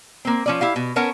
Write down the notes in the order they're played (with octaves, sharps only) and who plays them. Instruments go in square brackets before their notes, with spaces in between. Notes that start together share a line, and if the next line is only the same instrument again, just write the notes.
[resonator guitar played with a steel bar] A#3 C4
F3 C#4 D5
E4 G4 F5
B2
B3 C#4 A#4 C#5 A5